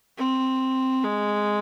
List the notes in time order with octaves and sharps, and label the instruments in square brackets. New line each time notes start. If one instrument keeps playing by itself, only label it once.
[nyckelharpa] C4
G#3